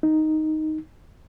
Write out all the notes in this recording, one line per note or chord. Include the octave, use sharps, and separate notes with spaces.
D#4